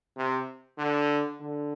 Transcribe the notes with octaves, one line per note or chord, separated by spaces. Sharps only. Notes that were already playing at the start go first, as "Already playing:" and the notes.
C3
D3
D3